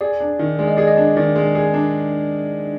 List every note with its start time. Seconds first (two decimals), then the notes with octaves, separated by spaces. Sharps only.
0.01 G#4 D5
0.20 D4
0.39 D#3
0.59 G#3 D5
0.68 D#5
0.77 G#4 D5
0.87 D#5
0.96 D4 D5
1.16 D#3 D5
1.36 G#3
1.55 G#4
1.74 D4